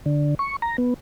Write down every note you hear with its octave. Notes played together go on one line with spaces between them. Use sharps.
D3
C#6
A#5
B3